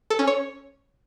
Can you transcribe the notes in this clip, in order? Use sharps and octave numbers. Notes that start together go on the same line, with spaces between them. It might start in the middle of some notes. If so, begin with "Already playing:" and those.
A4
C#4
C#5